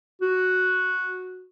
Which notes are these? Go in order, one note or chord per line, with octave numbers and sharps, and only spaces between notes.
F#4